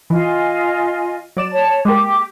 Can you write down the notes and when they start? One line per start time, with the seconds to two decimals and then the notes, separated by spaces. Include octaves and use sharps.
0.10 E3 F4 D#5 G#5
1.37 F#3 D5 E7
1.51 C#5 A5
1.85 G#3 A#3 G4 D6